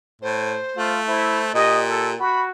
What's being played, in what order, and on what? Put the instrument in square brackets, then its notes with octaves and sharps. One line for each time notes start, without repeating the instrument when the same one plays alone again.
[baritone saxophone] A2 [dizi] C5
[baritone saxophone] A3 [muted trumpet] F4
[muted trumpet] E4 [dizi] C5
[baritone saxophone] A#2 [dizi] G4 [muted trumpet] D#5
[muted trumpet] A4
[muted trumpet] F#4 [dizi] B5